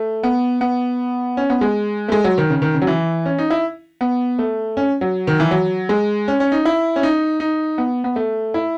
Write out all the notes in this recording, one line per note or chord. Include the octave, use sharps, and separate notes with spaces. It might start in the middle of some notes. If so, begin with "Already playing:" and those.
Already playing: A3
B3
B3
C#4
B3
G#3
A3
G#3
F#3
D#3
C#3
D#3
C#3
F#3
E3
C#4
D#4
E4
B3
A3
C#4
F#3
D#3
E3
F#3
G#3
C#4
C#4
D#4
E4
C#4
D#4
D#4
B3
B3
A3
E4